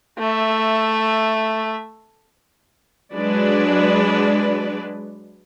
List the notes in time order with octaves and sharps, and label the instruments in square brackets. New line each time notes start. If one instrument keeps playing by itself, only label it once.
[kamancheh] A3 E5
[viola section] F#3 G#3 D4 B4 D5